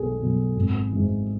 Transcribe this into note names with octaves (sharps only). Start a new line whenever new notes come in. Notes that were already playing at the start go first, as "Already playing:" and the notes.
Already playing: B1 B2 F#3 G#4 A4
B2 F#3
G#1
G#2 E3